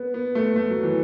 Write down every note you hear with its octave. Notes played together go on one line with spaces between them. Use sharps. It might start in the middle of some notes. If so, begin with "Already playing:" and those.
Already playing: B3
B3
A3
A3
F#3
E3